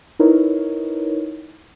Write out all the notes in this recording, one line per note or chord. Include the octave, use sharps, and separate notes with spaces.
D#4 E4 A#4 B4 C#5